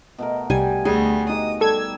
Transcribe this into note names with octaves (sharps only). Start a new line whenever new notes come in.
B2 A3 A#4
C2 G3 G#5
D2 G3 G#4 F#5
D#4 F#4 G4 D#6
G3 A4 E6 G#6